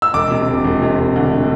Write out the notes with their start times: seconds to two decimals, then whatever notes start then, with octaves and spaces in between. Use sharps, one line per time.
0.02 E6
0.14 E1 D6
0.31 C3
0.48 E1
0.65 E1
0.82 C3
0.98 E1
1.16 D2